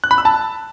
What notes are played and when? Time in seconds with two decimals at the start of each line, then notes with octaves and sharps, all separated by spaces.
0.04 F#6
0.11 B5
0.18 E6
0.25 A5